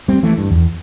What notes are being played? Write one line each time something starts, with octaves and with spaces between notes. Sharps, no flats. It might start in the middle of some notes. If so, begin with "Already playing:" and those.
G3 C4
E3 A3
G2
E2